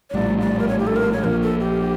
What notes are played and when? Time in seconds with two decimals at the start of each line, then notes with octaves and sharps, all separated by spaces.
0.10 C#5
0.14 A#1 A2 G3 D5
0.41 D5
0.59 A#4
0.68 C#5
0.79 G4
0.87 A4
0.96 A#4
1.12 C#5
1.23 A#1 A#2 F3 A#4
1.42 A4
1.60 G4